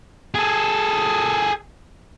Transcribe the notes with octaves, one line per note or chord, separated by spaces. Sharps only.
G#4 A4